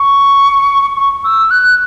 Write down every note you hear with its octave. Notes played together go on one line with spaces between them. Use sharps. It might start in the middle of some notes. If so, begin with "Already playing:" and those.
Already playing: C#6
C#6
E6
F#6